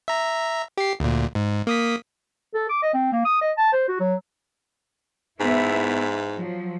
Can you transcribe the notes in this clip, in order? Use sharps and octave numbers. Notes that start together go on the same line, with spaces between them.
E5 A#5
G4 C7
D2 A#2
G#2
A#3 D#6 B6
A4
D6
D#5
C4
A#3
D#6
D#5
A5
C5
F#4
F#3
G#2 B3 E4 E5
F3 F#3